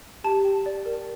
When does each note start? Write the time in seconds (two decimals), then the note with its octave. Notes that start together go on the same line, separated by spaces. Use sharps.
0.24 G4 A5
0.44 G5
0.66 D5
0.86 A#4